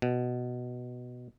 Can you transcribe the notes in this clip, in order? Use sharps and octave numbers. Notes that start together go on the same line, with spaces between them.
B2